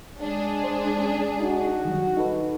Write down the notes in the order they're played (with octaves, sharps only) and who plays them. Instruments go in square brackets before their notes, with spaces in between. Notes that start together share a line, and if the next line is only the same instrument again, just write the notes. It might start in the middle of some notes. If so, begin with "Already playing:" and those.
[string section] G#3 D4 G#4
[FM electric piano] C5
C#4
[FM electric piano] D#4 [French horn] F#4
[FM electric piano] D#3 F#3 G3
D#4 A4 B4